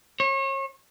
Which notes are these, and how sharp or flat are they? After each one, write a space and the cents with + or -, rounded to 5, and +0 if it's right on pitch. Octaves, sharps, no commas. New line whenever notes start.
C#5 -35